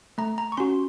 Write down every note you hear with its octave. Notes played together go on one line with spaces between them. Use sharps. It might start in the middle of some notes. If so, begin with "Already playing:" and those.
A3 A#5
A#5
C#6
C#4 F#4 C6